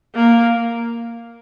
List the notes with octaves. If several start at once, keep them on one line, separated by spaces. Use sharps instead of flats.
A#3